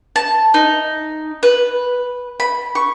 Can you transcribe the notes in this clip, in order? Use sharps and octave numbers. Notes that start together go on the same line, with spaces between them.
A5
D#4
B4
B5
C#6